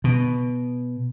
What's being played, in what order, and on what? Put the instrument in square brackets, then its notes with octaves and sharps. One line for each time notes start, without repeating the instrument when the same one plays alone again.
[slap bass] B2